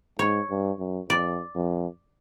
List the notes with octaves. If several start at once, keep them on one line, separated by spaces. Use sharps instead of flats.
G#2 C#5
G2
F#2
F2 D5
F2